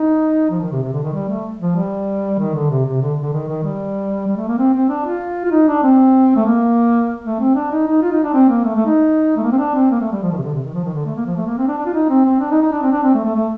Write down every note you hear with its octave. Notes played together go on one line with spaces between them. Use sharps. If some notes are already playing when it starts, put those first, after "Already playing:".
Already playing: D#4
F3
D#3
C3
C3
D3
D#3
G3
A3
F3
G3
D#3
D3
C3
C3
D3
D3
D#3
D#3
G3
G3
A3
A#3
C4
C4
D4
F4
F4
D#4
D4
C4
A3
A#3
A3
C4
D4
D#4
D#4
F4
D#4
D4
C4
A#3
A3
A3
D#4
A3
A#3
C4
D4
C4
A#3
A3
G3
F3
D#3
C3
D3
C3
D#3
F3
D#3
D3
A3
A#3
F3
A3
A#3
C4
D4
D4
F4
D#4
C4
C4
D4
D#4
D#4
D4
C4
D4
C4
A3
A3
A3